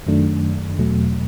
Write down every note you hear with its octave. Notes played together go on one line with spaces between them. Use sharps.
F#2 D#3 F#3 A3 D4
E2 B2 F#3 A3